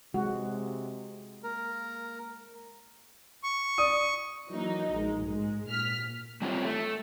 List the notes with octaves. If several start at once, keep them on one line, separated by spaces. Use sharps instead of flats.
C3 G#3 F#4
A#3 A#4
C#6
D5 D#6 D#7
E3 F#3 A#3 D#4
A#1 G#3
G#2 G#3
A#2 F6 B6
G3 C4 F4 G4 C#5
A3